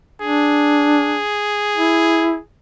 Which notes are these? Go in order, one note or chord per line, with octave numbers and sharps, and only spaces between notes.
D4 G#4
E4